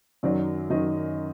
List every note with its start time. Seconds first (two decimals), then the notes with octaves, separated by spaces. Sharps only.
0.23 F#2 D#3 F#3 D5
0.70 F#2 D#3 F#3 D#5